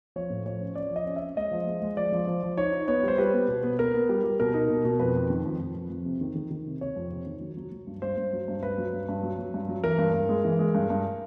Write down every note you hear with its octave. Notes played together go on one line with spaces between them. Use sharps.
F3 C#5
A2
F3 C#5
C#4
C#4 D5
F3
D#5
C#4
E5
C#4
G#3 D#5
F3
G#3
G#3
F3 D5
F3
F3
F3
D#4 C#5
D#4
B3 C#5
G3 C5
G3 B4
B3
B2
B3
B3 A#4
B3
G3
G3
B2 A#4
D#4
B2
B2
F2 B4
F2
D#3
F2
F2
F2
F2
C3
D#3
D#3
D#3
C3
C3 C#5
F2
C3
D#3
F#3
F#3
F#3
G2
G2 C5
G2
F#3
G2
G2 B4
F#3
G2
G2
F#3
F#3
G2
F#3
E3 A#4
G2
G2
G#3
E3
G#3
G2
G2